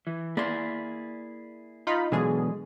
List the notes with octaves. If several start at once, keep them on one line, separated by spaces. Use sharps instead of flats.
E3
A#3 E4 G#4 D5 C6
D#4 F4 B5
B2 D3 E3 F#3 G#3 G#4